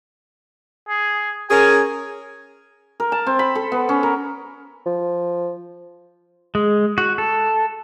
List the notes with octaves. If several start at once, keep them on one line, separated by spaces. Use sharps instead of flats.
G#4
C#4 G#4 A#4 G#5
A#4
A5
C4
B5
A4
B3
C#4
A#4
F3
G#3
F#4
A4